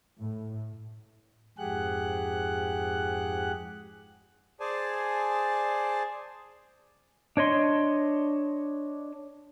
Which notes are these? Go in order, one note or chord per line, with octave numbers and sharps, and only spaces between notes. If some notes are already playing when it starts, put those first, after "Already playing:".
A2
F2 G#2 G4 G#4 F#5 F#6
G#4 C5 D5 G#5 A5
D4 C#5 D#5 C6